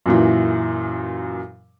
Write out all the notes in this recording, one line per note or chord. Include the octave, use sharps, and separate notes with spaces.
F#2 A#2 E3